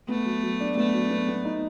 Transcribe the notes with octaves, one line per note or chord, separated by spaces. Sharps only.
A3 B3
F#3
F#3
D4
A3 B3
F#3
B3
B3
D#4